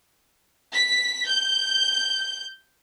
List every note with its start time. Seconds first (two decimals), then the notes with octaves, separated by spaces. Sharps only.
0.73 B6
1.27 G6